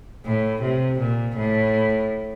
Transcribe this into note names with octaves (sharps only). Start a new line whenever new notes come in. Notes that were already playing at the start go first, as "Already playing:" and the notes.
A2
C3
A#2
A2